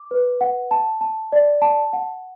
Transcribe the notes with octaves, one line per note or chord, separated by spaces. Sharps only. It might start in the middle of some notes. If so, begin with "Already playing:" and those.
Already playing: D6
B4
F#5
A5
A5
D5
A5
F#5